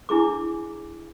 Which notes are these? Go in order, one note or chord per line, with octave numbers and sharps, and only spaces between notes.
D4 E4 G#4 D6